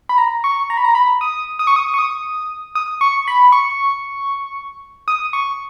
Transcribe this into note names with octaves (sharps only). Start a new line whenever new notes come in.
B5
A#5
C#6
A#5
B5
A#5
B5
D#6
D#6
C#6
D#6
C#6
D#6
D#6
C#6
B5
C#6
D#6
C#6